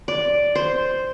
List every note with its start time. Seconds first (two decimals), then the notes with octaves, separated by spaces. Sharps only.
0.08 D5
0.55 C5